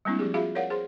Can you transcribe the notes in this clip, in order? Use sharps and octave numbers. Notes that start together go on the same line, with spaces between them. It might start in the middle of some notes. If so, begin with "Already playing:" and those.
G3 G#3 A#3 C4 D4 E4
F3 G4 G#4
F4 F#4 G#4 E5 F5 B5
A#4 C#5 D5 F5 F#5
G#4 C5 C6